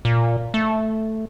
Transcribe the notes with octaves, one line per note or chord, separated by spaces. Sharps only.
A#2
A3